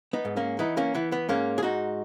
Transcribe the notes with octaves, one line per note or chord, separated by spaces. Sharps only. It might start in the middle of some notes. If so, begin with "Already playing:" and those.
B3 D#4
G#2
A#3 C#4
E3 B3 D#4
A#3 C#4
E3 B3
B3
G#2 A#3 C#4
G#4
G#2 D#4 F#4